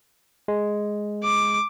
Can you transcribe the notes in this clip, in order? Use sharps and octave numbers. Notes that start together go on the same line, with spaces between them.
G#3
D6